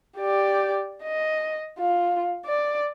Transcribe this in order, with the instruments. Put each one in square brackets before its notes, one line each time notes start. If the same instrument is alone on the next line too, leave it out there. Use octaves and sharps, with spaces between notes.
[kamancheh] G4 D5
D#5
F4
D5